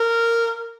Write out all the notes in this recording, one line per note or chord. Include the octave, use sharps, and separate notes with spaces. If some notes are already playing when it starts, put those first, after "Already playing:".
Already playing: A#4